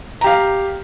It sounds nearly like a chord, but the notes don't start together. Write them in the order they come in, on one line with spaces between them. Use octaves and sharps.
A#5 G4 F5